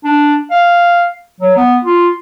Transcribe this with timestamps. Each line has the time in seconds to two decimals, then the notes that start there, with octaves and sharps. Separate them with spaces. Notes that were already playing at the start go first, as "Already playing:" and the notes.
0.04 D4
0.51 F5
1.41 F#3
1.56 B3
1.85 F4